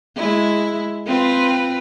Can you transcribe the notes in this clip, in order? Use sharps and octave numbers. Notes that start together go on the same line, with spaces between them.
G#3 E4
C4 F4 B4